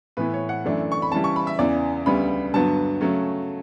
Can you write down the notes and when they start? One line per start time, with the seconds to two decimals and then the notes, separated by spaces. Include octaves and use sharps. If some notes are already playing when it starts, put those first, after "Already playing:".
0.17 A2 E3 B3 E4 B4
0.34 C#5
0.49 F#5
0.65 F#2 E3 A3 D4
0.92 C#6
1.02 B5
1.11 C#3 E3 G3 A5
1.24 C#6
1.36 B5
1.47 E5
1.59 E2 C#3 E3 D5
2.06 D2 C#3 G3 B3 B5
2.54 G2 D3 F#3 B3 A5
3.01 C#3 F#3 A3 C#4